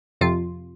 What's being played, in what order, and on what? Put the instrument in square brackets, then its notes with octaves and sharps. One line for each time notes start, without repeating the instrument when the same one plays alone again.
[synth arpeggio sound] F2 C3 F3 F4